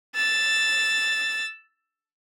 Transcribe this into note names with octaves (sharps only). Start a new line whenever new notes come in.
E6 A6